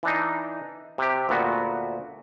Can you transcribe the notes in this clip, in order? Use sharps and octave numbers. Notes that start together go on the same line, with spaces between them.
E3 D4 D#4
C3 G4
D2 A#2 B3 F#4